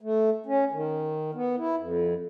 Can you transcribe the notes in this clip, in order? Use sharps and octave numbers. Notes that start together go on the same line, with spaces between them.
A3
C#4
D#3
B3
E4
F2